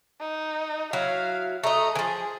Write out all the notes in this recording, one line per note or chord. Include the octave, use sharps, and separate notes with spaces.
D#4
F#3 E4 F5
A3 D#5 A#5
E3 F3 G#4